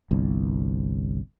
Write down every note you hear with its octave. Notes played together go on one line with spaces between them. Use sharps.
G1 C2